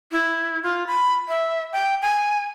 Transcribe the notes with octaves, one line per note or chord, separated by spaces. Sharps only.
E4
F4
B5
E5
G5
G#5